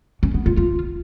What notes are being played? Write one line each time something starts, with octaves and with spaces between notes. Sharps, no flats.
C#4
B3
F4
F4